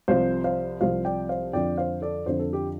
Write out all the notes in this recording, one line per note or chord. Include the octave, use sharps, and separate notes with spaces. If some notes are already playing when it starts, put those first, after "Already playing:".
C2 C3 F3 C5 F5
C5 F5
C2 C3 F3 C5 F5
D5 G5
C5 F5
F2 D3 F3 D5 G5
C5 F5
A4 D5
F2 D3 F3 C5
A4
G4